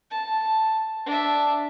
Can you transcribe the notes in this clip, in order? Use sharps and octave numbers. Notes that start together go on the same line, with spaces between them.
A5
D4 E5